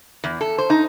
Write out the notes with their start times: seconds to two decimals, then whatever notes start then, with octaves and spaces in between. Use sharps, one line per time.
0.24 E2
0.41 A4
0.58 C5
0.70 D#4